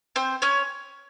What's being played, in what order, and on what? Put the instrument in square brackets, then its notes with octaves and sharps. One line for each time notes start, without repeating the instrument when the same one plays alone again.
[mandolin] C4 C5
C#4 C#5